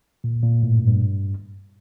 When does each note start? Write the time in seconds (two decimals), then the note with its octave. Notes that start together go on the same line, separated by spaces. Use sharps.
0.24 A#2
0.43 A#2
0.63 A2
0.75 G2
0.88 G2